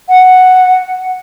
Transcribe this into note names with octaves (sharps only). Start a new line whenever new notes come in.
F#5